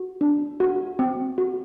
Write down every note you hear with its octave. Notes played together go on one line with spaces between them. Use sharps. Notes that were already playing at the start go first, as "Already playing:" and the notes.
Already playing: F#4
D4
F#4
C4
F#4